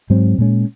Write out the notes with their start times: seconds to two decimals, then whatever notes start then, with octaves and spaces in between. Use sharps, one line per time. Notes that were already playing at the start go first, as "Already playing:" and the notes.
0.10 G#2 F#3 C4
0.38 A#2 G#3 C#4